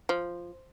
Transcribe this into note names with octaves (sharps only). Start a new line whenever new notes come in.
F3